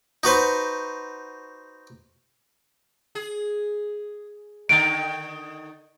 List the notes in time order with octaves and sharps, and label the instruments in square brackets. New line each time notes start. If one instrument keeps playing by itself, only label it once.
[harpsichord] D#4 F#4 B4 C5
[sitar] G#4
[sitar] D3 D#3 D#4 [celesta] D7